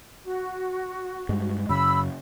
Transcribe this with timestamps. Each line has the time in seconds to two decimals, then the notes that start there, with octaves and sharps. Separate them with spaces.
0.24 F#4
1.29 G2 G#3
1.69 F#2 C#3 B5 E6